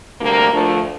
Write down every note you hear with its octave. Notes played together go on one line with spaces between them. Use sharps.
D2 C3 G3 A#3
D2 D3 F3 A3